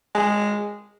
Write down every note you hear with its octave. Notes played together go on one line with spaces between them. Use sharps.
G#3